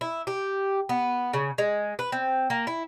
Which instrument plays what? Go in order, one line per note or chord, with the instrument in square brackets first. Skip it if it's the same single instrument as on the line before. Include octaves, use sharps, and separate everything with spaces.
[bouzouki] E4
G4
B3
C#3
G#3
B4
C4
A#3
E4